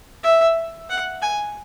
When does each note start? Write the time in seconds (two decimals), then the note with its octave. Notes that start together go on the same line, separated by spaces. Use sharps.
0.23 E5
0.89 F#5
1.22 G#5